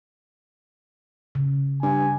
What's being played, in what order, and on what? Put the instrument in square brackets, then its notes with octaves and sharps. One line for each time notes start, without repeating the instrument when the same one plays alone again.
[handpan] C#3
[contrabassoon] G2 [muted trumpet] G#5